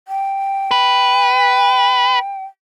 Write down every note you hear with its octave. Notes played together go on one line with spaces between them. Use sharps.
G5
B4